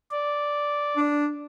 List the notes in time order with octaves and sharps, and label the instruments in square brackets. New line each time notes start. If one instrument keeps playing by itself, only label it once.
[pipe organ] D5
[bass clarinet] D4